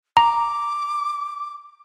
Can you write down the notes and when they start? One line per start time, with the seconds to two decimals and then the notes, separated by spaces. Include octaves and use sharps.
0.17 A#5 D6